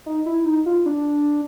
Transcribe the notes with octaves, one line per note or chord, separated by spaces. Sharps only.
D#4
E4
D#4
F4
D4